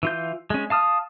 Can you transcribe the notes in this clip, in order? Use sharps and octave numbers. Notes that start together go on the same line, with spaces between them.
E3 F4 G6
G#3 C#4
F5 A5 D#6 F6